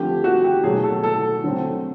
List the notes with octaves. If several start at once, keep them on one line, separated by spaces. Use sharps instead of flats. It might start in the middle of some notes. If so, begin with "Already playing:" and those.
Already playing: D3 F3 A3 C4 G4
F#4
G4
B2 F#3 A3 G#4
A4
A4
D3 F#3 A3 C4